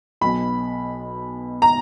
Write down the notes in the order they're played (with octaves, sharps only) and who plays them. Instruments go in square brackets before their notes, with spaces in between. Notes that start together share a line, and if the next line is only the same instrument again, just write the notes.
[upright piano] B1 B2 B5
A#5